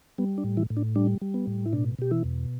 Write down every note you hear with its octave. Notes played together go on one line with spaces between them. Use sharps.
G3 B3
D4
A2
E3 E4
A2
D4
G3 D4
G3
B3
A2
E4
B2 D4
B2 G4
E3 E4
E2